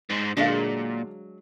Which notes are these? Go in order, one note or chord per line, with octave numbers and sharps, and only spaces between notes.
G#2 G#3
A#2 D3 F#3 G#3 D4 F5